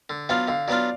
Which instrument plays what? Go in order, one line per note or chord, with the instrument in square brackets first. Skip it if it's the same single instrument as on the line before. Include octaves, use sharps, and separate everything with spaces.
[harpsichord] D3
[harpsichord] F#3 B3 D4 F4 [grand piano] F5
[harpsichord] D3 [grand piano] F5
[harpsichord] F#3 B3 D4 F4 [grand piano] D5